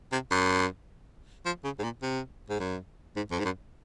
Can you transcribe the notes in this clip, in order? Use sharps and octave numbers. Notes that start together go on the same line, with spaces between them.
C3
F#2
F3
C#3
G#2
A#2
C3
G#2
F#2
G#2
F2
G#2
F#2